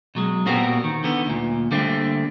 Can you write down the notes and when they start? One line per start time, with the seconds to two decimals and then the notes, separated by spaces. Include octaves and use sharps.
0.15 B2 F#3 G#3
0.46 A#2 B3 C4 F#4 G4 A#4
0.84 D#3
1.04 D3 D#3 B3
1.26 D2 A#2
1.71 D3 G3 A3 A#3 C4